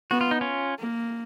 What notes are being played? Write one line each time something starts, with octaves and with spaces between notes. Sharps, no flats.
B3 F#4
F4
D#4
C#4 F4
A#3